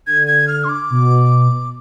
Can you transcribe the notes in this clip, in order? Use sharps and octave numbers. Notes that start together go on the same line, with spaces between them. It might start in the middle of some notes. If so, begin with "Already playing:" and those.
D3 G#6
G#6
F6
C6
D6
B2